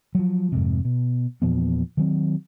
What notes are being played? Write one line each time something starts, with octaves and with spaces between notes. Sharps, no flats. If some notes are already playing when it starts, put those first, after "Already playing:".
F3 F#3
F2 G#2 C3
B2
E2 A#2 F3 B3
D#3 F#3 C4